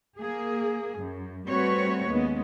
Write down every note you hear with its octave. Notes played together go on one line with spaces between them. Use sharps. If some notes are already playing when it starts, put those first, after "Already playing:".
A#3 G#4
F#2
G3 A3 C4 F#4 B4 C#5
D#2 G#3 B3 C#4